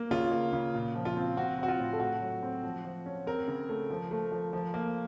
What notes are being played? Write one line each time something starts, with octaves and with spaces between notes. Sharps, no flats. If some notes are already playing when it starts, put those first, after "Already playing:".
Already playing: A#3
C#3 F4
A#3
C#3
A#2
F3
F4
C4
C4 F#4
C4 F#4
F4
A2
A4
A3 F#4
F#3
C4
F3
F3
C#4
C4 A#4
C#3
A3
F3
A3
F3
F3
A#3